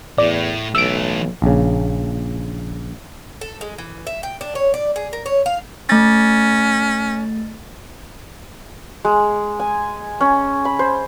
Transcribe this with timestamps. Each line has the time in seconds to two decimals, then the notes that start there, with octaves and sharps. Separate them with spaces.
0.18 E2 A2 D5
0.75 B1 E3 A3 E6 D7
1.42 A#1 C#3
3.41 A4
3.61 G#3
3.78 E3
4.07 E5
4.23 G5
4.41 D4
4.55 C#5
4.74 D5
4.96 G#4
5.13 A#4
5.26 C#5
5.46 F5
5.89 A3 C#4 A6
9.05 G#3
9.60 G#5
10.21 C#4
10.65 B5
10.79 C5